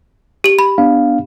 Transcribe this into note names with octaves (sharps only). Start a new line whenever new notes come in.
G4 F#7
B5
B3 D4 F5